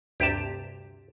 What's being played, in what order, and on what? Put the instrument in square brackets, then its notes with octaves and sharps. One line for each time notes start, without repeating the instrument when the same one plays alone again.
[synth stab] D2 G2 C3 [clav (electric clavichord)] G4 A5